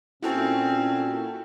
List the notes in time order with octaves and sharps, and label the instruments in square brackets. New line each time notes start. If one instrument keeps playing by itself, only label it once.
[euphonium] A#2 [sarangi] C4 [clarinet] C#4 [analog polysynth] E4 F#4 A4